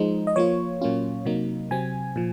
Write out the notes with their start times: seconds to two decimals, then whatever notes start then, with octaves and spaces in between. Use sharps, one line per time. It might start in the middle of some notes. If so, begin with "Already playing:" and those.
Already playing: F3 G#3 D#4 C5
0.27 D#5
0.36 F3 A#3 F4 C#5
0.82 A#2 F#3 A#3 C#4 F4
1.25 C3 F#3 A#3 D#4
1.71 C3 F#3 C4 G#5
2.16 A#2 F3